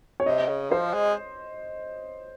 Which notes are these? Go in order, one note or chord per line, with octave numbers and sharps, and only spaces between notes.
C#5
C3 D#5
C#3
F3 C5
G#3